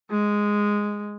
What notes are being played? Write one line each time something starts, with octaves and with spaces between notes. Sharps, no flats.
G#3